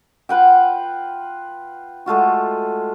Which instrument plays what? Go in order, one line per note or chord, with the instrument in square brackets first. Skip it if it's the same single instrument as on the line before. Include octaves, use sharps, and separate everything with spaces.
[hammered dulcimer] F4 B4 F#5 G5
G#3 A3 F4 F#4